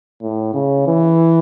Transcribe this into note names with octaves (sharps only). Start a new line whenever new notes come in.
A2
C#3
E3